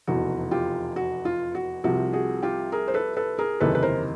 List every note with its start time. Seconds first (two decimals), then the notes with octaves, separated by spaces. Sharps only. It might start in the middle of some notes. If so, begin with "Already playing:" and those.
0.07 F1 E2 B2 F#4
0.51 F4 G4
0.96 F#4
1.25 F4
1.55 F#4
1.84 C2 C3 F3 F#4
2.13 F#4 G#4
2.43 F4 G4
2.72 G#4 A#4
2.88 C5
2.94 A4 B4
3.17 A4 B4
3.39 G#4 A#4
3.60 F#1 E2 C3 D#3 A4 B4
3.75 B4
3.83 A#4 C5